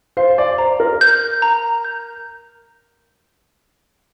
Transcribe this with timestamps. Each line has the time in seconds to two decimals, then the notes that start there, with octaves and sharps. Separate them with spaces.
0.17 C5 F5
0.38 D5
0.58 C5 A#5
0.80 A#4
1.01 G6
1.42 A#5
1.84 G6